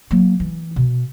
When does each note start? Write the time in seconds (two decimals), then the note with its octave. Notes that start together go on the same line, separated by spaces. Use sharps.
0.11 F#3 A#3
0.40 E3
0.76 B2